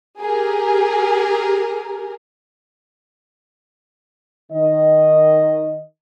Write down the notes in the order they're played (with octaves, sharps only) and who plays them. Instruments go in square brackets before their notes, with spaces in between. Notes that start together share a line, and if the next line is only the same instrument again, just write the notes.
[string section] G4 G#4 A#4
[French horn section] D#3 D#5